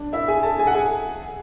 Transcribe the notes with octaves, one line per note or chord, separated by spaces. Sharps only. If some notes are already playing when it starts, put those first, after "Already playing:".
Already playing: D4
E4 E5
G#4 G#5
A4 A5
G#4 G#5
F#5
G#4 G#5